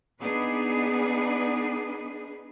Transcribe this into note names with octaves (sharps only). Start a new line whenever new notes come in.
B3 D4 D#4 G#4 B4